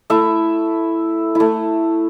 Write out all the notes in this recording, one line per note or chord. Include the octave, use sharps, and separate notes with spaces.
A3 E4 E5
A3 E4